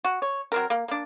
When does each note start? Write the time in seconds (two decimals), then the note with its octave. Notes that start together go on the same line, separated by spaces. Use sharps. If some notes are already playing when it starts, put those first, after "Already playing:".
0.05 F#4
0.22 C#5
0.52 F#3 C4 A#4
0.70 A#3
0.88 A#3 D4